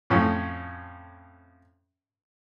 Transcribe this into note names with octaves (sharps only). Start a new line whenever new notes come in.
F2 A2 F3 C#4